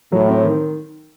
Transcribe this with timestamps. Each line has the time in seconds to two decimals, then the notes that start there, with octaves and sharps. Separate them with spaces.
0.12 A2 F#3
0.28 C4
0.44 D#3